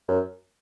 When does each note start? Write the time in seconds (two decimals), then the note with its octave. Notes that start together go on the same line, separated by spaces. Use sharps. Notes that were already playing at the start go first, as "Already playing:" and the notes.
0.08 F#2